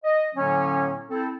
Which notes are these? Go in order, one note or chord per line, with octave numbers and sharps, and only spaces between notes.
D#5
A2 D3 F#3 A#3 C#4
C4 E4 A4